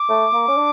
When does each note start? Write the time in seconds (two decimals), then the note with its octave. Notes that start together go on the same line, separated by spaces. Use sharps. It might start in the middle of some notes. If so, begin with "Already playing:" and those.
Already playing: D6
0.09 A3
0.33 A#3
0.48 C#4
0.57 D4